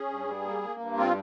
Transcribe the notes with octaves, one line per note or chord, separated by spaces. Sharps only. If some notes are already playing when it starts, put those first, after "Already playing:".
Already playing: C#4 G#4
G2
G3
A#3
A#3
G2
C4 F4